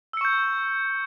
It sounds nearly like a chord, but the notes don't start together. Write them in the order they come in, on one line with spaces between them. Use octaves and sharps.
E6 C#7 C#6 G6